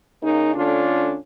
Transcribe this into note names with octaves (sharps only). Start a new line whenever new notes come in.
C#3 A#3 D#4
D3 A3 C#4 D4 F4